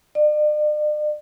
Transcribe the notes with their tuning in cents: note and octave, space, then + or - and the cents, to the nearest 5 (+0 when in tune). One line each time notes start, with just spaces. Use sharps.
D5 +45